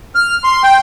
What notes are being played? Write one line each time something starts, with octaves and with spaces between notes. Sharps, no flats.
F6
C6
G5